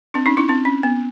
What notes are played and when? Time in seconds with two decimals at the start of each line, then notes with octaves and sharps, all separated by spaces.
0.14 C4 D4
0.26 C#4 D#4
0.37 D4 E4
0.48 C4 D4
0.65 C#4
0.83 B3